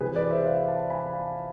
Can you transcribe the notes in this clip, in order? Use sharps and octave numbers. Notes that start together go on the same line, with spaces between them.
C3 E3 G#4 B4
B4 D5
C5 E5
D5 F5
F5 A5
G#5 B5
F5 A5